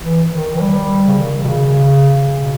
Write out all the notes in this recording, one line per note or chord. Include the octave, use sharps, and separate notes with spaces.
E3
D#3
E3
G3
C#3
D#3
B2
C#3
B2